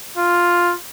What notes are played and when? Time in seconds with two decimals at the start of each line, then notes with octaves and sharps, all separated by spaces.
0.17 F4